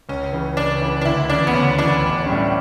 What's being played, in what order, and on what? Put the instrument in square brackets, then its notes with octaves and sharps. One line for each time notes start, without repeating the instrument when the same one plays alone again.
[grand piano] C#2 [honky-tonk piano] C#4
[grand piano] C#3 E3
[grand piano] C#2 [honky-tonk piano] D4
[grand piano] C#3 E3
[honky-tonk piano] D4
[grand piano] D2 [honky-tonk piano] E4
[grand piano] C#3 E3 [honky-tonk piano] D4
[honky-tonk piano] B3
[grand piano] D2 [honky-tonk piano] C#4
[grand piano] C#3 E3 [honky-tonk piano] D4
[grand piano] A1
A2 G3 C#4